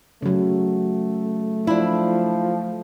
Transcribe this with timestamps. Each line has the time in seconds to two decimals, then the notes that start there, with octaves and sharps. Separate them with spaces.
0.22 C#3 F#3 A3
1.67 F3 D4 E4